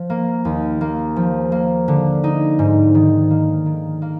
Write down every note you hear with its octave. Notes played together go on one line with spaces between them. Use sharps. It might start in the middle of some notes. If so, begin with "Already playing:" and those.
Already playing: F3
A#3
D#2
A#3
F3
A#3
D3
D#4
G#2
D#3
A#3
D#3
A#3